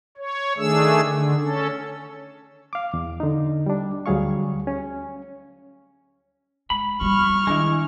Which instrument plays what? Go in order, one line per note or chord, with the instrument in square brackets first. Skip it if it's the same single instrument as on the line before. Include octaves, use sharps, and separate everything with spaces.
[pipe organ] C#5
D#3 A3 D4 G#4 E6
D3
C#4 A4
[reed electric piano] F5 D6
E2
D3 D#4
G3 D4
D2 F#3 G3 G#4 F5 C#6
C#4
[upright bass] G#3 [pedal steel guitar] B5
[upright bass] G3 F4 [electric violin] C#6 F6
[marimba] D#3 D4 [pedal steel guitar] G#3 E4